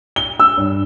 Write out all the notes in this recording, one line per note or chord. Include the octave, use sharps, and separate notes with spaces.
G7
E6
G2